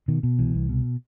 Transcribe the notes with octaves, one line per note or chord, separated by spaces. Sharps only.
B2 D#3
B2
C2 E3
C2
B2